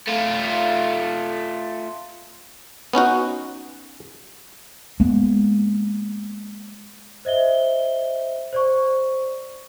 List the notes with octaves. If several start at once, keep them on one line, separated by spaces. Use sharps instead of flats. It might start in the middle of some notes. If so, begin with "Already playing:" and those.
A3 F4
B3 C#4 D#4 F#4
G#3 A#3 B3
C5 D#5 E5 G7
C5 D5 C#6